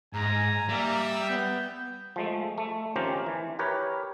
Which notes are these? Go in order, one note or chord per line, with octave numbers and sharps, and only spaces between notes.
G#2 G#5 A#5
G3 A#3 E5
B3 G6
F3 G#3 A3
A3
D#3 F3 C4 C#4 G4 A#4
E3
G4 A#4 B4 C#5